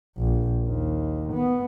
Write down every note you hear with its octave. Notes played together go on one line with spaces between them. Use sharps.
A#1
D#2
B3